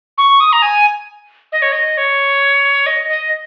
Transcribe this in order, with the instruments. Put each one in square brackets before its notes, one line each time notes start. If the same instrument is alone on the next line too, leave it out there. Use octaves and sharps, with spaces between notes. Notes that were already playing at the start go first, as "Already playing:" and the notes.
[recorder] C#6
D#6
A#5
G#5
D#5
C#5
D#5
C#5
D#5
D#5